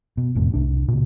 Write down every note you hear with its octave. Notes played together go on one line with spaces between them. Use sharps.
B2
E1 F2 A2 C3
C2 D4
A#2 C#3